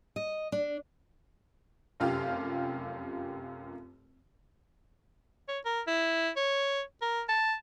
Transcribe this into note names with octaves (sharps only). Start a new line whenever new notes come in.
D#5
D4
F1 F#2 F4 G4 F6
C#5
A#4
E4
C#5
A#4
A5